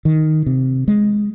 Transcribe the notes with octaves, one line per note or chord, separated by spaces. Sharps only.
D#3
C3
G#3